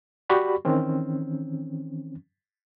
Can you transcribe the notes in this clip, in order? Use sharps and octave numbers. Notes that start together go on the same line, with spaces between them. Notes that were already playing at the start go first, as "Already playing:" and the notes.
F#4 G4 D5 B5 C#6
D#3 E3 C4 C#4